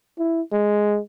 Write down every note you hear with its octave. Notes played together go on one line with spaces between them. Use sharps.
E4
G#3